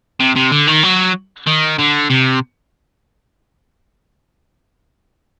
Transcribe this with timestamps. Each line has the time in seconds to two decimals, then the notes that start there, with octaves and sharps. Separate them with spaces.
0.20 C3
0.36 C3
0.52 D3
0.68 D#3
0.84 F#3
1.47 D#3
1.79 D3
2.10 C3